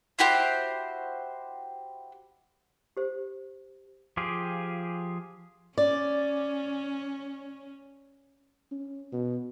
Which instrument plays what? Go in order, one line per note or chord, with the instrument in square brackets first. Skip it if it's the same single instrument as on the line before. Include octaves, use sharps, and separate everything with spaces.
[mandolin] E4 F#4 G4 C5
[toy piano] G4 C5
[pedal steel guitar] F3 F4 G4 G#4
[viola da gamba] C#4 [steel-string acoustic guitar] D5
[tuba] C#4
B2